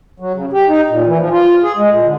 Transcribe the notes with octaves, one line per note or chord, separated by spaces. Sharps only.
F#3
C#3
G4
D#4
A#2
E3
F3
F4
G#4
G#3
A#2
D3